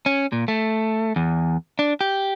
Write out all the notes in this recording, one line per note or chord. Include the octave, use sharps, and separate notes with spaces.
C#4
A#2
A3
E2
D4
G4